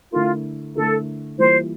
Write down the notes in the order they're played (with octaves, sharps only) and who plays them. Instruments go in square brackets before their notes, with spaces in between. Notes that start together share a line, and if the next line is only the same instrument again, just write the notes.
[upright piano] D3 A3 E4 A#4 [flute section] F4
[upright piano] D3 A3 E4 A#4 [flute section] A4
[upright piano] E3 G3 A#3 F4 [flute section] C5